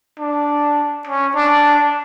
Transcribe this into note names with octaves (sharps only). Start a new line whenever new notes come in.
D4
C#4
D4